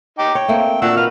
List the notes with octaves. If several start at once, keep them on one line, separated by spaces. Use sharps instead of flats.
D#4 G5 D6
C#5 G5
A3 A#3 C4
A#2 D4 F#4 F#5 E6
D#4 B4 F6